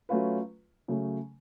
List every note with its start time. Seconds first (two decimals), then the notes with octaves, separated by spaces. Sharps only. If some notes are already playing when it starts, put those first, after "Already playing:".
0.09 F#3 A3 C#4 F4 B4
0.88 C#3 F#3 A3